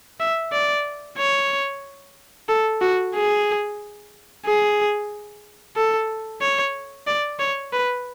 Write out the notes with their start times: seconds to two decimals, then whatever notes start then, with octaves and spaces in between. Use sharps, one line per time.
0.20 E5
0.52 D5
1.18 C#5
2.49 A4
2.81 F#4
3.15 G#4
4.45 G#4
5.76 A4
6.41 C#5
7.07 D5
7.40 C#5
7.73 B4